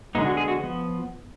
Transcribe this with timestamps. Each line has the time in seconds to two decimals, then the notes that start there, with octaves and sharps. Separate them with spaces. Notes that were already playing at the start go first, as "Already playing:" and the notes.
0.15 D3 G#3 B3 D#4
0.26 F#4
0.37 G#4
0.48 F#4
0.58 F3 B3